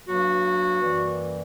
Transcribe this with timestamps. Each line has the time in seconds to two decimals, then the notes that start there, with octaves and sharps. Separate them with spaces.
0.08 G2 F#3 A#3 F#4
0.82 F#2 E3 G3 A#3